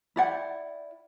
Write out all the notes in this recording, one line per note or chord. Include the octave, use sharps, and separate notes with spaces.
E4 D5 F#5 G5